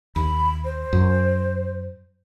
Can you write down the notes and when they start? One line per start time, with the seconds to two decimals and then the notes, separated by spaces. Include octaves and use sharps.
0.16 D#2 B5
0.65 C5
0.93 F#2